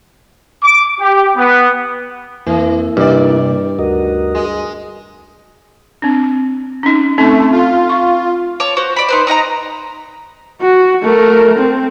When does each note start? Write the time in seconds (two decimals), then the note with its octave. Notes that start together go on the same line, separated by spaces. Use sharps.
0.62 D6
1.00 G4
1.37 B3
2.47 F2 E3 A#3 E4
2.97 G2 C3 D#3 D5
3.79 D2 F#4 A#4 D#5
4.35 G#3
6.02 C4 D4
6.83 C#4 D#4
7.18 A3 C4 C#4 D#4
7.51 F4
7.89 C#6
8.60 C#5 A5 D6
8.77 F#4 C5
8.96 D5 B5
9.08 D#4 B4 C5
9.27 D#4 D#5 F#5 A#5
10.61 F#4
11.02 A3 A#4
11.57 C4